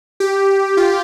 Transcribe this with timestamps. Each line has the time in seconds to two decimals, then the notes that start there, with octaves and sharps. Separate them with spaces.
0.20 G4
0.77 F4